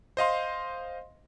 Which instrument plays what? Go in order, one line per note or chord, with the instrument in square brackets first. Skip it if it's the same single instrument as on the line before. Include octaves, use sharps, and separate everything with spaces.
[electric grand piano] C5 D#5 F5 C6